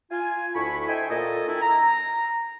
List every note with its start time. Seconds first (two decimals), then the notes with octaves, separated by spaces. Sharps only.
0.11 F4 G#5
0.55 D2 E4 B5 C#6
0.88 C5 D#5 E5 G5 G#5
1.10 A#2 A4 D#5
1.48 D#3 D4 E4
1.62 A#5